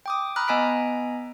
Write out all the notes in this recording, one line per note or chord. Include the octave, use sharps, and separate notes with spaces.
G5 D6 D#6
A#5 B5 D#6 F6 F#6
B3 D#5 G#5 A#5 B6 D7